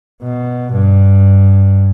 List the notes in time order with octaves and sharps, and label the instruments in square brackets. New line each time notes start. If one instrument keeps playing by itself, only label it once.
[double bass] B2
G2